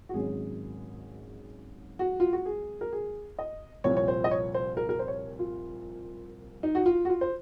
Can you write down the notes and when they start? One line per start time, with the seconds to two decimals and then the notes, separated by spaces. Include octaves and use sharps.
0.09 F#4
0.14 G#1 G#2 F#3 C#4 G#4
1.99 F#4
2.20 F4
2.33 F#4
2.46 G#4
2.81 A#4
2.93 G#4
3.39 D#5
3.84 C2 A#2 F3 C4 C#5
3.97 C#5
4.08 C5
4.24 D#5
4.31 C#5
4.54 C5
4.77 A#4
4.89 A#4
4.99 C5
5.08 C#5
5.39 F4
6.63 D#4
6.75 F#4
6.86 F4
7.05 F#4
7.10 F4
7.21 C5